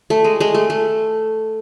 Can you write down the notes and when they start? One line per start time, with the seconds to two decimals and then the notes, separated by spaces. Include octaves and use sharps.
0.10 A3
0.24 G#3
0.40 G#3
0.54 A3
0.70 A3